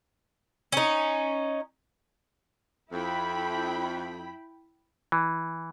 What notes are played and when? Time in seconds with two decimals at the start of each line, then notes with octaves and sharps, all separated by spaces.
0.72 C#4 D#4
2.91 F2 E4 G5 B5
5.12 E3